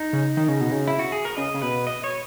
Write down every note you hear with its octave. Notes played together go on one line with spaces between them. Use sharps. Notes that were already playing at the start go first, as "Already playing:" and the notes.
Already playing: D#4
C#3
D#3
C#3
B2
C#3
E4
F#4
G#4
A#4
C#3 D#5
C#3
B2 B4
D#5
C#5